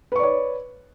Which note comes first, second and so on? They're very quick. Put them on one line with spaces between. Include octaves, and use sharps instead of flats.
B4 C#6 D5 C#5